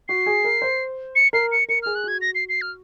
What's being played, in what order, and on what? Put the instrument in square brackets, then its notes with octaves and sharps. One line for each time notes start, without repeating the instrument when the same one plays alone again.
[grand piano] F#4 [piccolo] C7
[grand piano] G#4
A#4
C5
[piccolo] C#7
[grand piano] A#4 [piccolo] C7
[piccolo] C#7
[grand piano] A#4 [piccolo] C#7
[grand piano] G#4 [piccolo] F6
[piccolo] F#6
[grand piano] F#4 [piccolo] G#6
[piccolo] A#6
C7
C7
F6